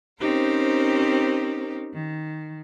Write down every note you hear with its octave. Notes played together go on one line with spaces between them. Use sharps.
C4 C#4 D#4 G4 A#4 C5
D#3